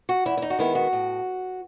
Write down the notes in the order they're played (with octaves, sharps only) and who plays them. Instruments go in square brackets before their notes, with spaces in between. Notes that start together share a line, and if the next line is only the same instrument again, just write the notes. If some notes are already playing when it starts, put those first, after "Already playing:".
[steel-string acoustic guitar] F#4
E2 E4
E4
D#4
F#4
D#3 G#3 B3 E4
F#4
A2